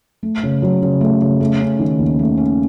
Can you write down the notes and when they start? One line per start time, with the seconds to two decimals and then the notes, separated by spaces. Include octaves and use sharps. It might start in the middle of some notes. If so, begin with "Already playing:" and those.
0.23 A3
0.43 C#3
0.62 F#3
0.82 C#3
1.01 A3
1.21 C#3
1.41 A3
1.61 C#4
1.79 D#3
1.98 D#2
2.19 A3
2.37 C#4